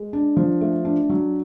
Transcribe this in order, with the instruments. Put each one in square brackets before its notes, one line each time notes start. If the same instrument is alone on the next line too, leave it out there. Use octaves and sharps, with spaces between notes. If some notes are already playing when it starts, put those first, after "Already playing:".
Already playing: [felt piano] G#3
D4
F3
A3
D4
F#3